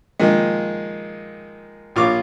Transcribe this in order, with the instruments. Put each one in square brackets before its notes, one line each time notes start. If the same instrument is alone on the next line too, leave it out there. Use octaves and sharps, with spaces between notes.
[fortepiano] A#2 D#3 F3 G#3
A#1 F4 C#5 D6